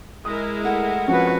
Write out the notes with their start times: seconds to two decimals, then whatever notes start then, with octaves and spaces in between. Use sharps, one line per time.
0.25 G#3 E4 A#4 D#6
0.64 A3 F#5
1.07 F3 C4 C#4 F#4 B4